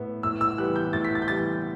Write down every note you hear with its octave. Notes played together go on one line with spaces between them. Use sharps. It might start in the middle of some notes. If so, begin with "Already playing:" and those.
Already playing: A2 B3
A2 E6
E6
E3 G3 B3 F#6
G6
A2 A6
B6
A6
G6
E3 G3 B3 A6